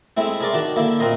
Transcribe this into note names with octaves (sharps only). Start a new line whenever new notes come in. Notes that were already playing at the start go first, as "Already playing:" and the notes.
G#3 A3 C4 E4
G#4 A#4 D5 C6
D#3 D4 F#4
D3 A#3 E4
A#2 C4 A#4 D#5 C6